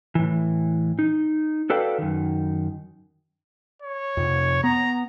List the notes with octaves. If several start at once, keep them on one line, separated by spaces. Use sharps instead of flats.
A2 E3
D#4
F#4 A4 B4 D5 F5 G5
F#2 D#3
C#5
F2 C3
B3 A#5